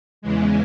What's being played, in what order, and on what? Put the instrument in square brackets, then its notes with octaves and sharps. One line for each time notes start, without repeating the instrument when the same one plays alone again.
[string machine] E2 C#3 E3 G#3